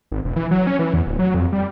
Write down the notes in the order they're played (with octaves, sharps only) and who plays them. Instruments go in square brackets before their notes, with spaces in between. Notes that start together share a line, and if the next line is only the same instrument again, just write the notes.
[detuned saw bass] G#1
E1
E3
F#3
C#4
E3
E2
D1
F#3
F2
G3